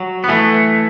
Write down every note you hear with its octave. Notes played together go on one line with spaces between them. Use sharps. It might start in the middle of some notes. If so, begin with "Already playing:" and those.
Already playing: F#3
B3
E3 A3